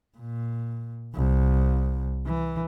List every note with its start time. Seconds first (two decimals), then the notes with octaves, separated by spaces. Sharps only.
0.18 A#2
1.15 C2
2.26 E3